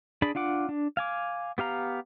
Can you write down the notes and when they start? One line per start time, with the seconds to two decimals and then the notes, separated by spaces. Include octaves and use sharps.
0.22 D4 G#4 D5 B5
0.35 D4 F4 F#5 D6
0.69 D4
0.97 F5 G#5 D6
1.58 B3 G4 F5 A#5